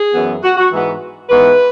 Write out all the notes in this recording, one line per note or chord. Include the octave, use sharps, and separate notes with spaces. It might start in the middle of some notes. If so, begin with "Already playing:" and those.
Already playing: G#4
F#2 E3 B3
F#4
F#4
G#2 E3 G#3 B3
G#2 E3 B3 B4